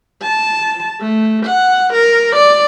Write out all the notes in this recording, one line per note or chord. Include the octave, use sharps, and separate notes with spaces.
A5
A3
F#5
A#4
D5